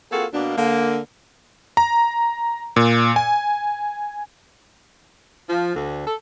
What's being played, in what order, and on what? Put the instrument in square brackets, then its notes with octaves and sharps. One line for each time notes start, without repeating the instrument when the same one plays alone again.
[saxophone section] A#3 C4 F4 F#4 G#4 A4
B2 A#3 D4
D3 A#3
[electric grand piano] A#5
A#2
G#5
[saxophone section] F3
D2
A4